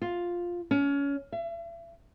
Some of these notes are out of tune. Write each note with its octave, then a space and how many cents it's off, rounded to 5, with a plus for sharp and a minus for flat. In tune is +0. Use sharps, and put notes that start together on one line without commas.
F4 +5
C#4 +25
E5 +40